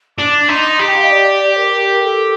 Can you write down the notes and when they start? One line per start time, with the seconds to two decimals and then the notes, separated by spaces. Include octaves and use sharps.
0.18 D4 D6
0.40 D6
0.49 D#4 C6
0.79 G4 A#5
0.88 G5
0.97 F5
1.04 D#5
1.10 D5
1.57 A#4
2.03 A4